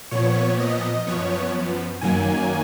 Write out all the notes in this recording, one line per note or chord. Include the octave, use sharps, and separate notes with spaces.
A#2 F3 B3 C#5
D#5
F#2 F3 B3 C#5
F#2 D#3 F#3 A#3 G#5